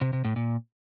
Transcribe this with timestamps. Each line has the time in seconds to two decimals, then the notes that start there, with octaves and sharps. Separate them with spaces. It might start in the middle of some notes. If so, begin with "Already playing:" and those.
0.01 C3
0.13 C3
0.25 A2
0.36 A#2